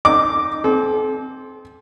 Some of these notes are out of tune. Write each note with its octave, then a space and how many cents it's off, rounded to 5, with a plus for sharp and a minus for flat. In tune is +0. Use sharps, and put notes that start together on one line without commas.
D#4 +0 D6 +0
C4 +0 A4 -40